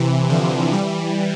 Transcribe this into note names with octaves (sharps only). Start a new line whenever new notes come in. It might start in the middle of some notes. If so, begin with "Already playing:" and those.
Already playing: C3 E3
D3 F3
E3 G3